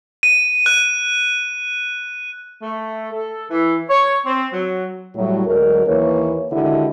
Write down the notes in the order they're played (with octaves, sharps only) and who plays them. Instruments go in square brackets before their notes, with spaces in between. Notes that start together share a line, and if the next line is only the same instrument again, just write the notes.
[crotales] D#7
F#6
[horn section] A3
A4
E3
C#5
C4
F#3
[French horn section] A2 F#3 G3
D2 D3 F#3 G#3 A#4
D#2 E3 A#3 B4 C#5
D3 D#3 G#3 E4 F#4 G4